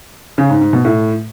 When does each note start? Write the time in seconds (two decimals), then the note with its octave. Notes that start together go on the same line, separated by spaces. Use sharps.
0.38 C#3
0.50 G#2
0.61 G#2
0.73 B2
0.85 A2